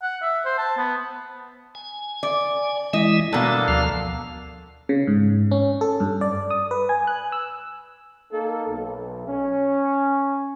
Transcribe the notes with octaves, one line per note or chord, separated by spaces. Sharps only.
F#5
E5
C5
A5
B3
G#5
D5
E3 G#3 E4 D#5
G2 B2 A#3 D4 A4 A5
D2 F3 F5
C#3
G#2
C#4
A4
G2
D5
D#6
B4
G#5
F#6
E6
A#3 D#4 A4
B1
C#4